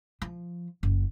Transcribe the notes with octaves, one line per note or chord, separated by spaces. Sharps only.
F3
F#1